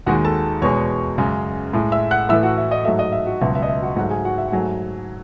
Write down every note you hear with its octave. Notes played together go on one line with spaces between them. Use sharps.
D#2 D#3 G#3 F#4 F#5
A4 A5
E2 B2 G#3 C#5 C#6
F#2 C#3 G#3
A2 G#3
E5 E6
F#5 F#6
A2 E3 A3 E5 E6
F#4 F#5
E5
D#5
G#2 F#3 A3 E5
D#5
E5
F#4 F#5
C#2 B2 F#3 E5
E5
D#5
E5
F#4 F#5
G#2 F#3 A3 F#4 F#5
G#4 G#5
F#4 F#5
E5
F#5
G#2 F#3 A3 G#4 G#5